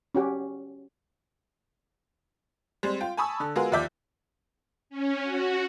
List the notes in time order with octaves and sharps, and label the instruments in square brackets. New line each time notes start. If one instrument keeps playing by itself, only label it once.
[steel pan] C#4 F#4 G4
[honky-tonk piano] G3 G#3 C4
F4 G5
G#5 A5 B5 C#6 D#6 E6
D3 A4
G#3 B3 F4 F#4 G#4 A#4
D#2 F3 D5 E5 D6 G6
[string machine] C#4
F#4